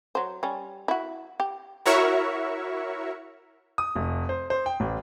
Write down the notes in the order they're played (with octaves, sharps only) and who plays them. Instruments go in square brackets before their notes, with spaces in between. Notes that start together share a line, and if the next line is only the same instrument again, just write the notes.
[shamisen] F#3 C5
G3 C#4
E4 F#4
G4
[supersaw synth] E4 F#4 A#4 C#5 E5 C#6
[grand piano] D#6
F1
C5
C5
G5
A1